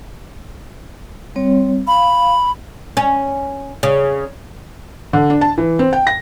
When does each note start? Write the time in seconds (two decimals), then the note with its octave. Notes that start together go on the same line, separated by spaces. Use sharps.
1.36 G3 C4 C#5
1.87 F5 B5
2.97 C#4
3.83 C#3
5.13 D3
5.30 D4
5.41 A5
5.58 E3
5.79 C4
5.93 G5
6.07 A#6